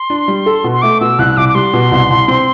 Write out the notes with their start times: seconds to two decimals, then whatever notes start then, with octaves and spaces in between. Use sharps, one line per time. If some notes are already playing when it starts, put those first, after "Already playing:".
Already playing: C6
0.10 D4
0.28 G3
0.46 A4
0.64 B2
0.73 C6
0.82 A3 D6
1.01 B2 E6
1.19 C2 F#6
1.37 C2 D6
1.49 D6
1.55 G3 C6
1.73 B2
1.92 C2
2.10 C2
2.28 C4